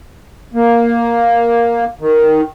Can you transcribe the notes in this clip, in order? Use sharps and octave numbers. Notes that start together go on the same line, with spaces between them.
A#3
D#3